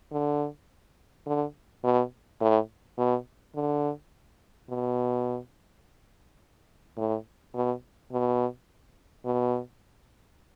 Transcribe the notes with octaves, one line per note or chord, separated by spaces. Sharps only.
D3
D3
B2
A2
B2
D3
B2
A2
B2
B2
B2